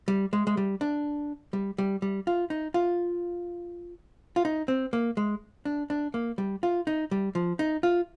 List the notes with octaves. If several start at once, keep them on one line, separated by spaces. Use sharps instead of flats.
G3
G#3
G#3
G3
D4
G3
G3
G3
F4
D#4
F4
F4
D#4
C4
A#3
G#3
D4
D4
A#3
G3
F4
D#4
G3
F3
D#4
F4